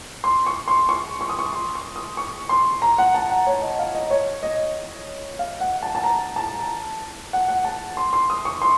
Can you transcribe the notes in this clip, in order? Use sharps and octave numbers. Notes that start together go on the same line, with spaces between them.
C6
C#6
C6
C#6
C#6
D#6
C#6
C6
C#6
D#6
C#6
C6
A#5
F#5
A5
F#5
C#5
D#5
F5
D#5
C#5
D#5
F5
F#5
A5
A5
A#5
A5
F#5
F#5
A5
C6
C6
D#6
C#6
C6